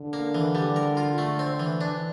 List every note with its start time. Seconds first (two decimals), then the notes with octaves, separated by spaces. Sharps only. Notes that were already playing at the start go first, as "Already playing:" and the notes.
Already playing: D3
0.13 A#3
0.35 E3
0.55 G3
0.76 A#4
0.97 F4
1.18 A3
1.39 C4
1.60 E3
1.81 D4